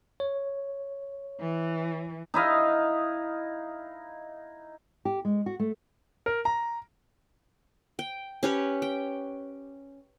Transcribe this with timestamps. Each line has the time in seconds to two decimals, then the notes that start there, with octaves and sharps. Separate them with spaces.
0.20 C#5
1.40 E3
2.34 D#4 E4 D#5 F5
5.05 G4
5.25 G#3
5.46 F#4
5.60 A3
6.26 A#4
6.45 A#5
7.99 G5
8.43 C#4 G4 B4 C#5
8.82 G5